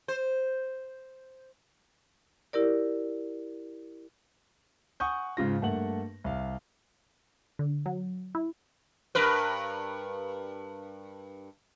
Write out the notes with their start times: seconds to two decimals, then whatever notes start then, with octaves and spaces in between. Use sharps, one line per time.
0.08 C5
2.53 E4 G4 A#4 D5
5.00 F#5 G#5 C#6 D#6 G6
5.37 G#2 C#3 F4 A#6
5.62 G2 A3 A#3 F#5 F#7
6.24 C2 F5
7.59 D3
7.86 F#3
8.35 E4
9.15 G2 A#4 B4